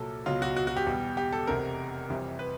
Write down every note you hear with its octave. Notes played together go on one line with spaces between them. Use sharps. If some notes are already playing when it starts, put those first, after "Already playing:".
Already playing: C2 A#2 F#3 A4
C#2 B2 F#3 F4
F#4
F#4
F#4
G4
E2 B2 G3
G4
A4
F1 E2 C3 A#4
F2 C3 E3 G3
B4